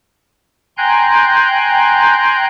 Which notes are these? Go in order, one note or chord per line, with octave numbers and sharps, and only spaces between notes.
G5 G#5 A#5 C6 F#6 G6